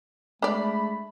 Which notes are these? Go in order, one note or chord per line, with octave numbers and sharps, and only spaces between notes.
G#3 A3 D4 D5 B5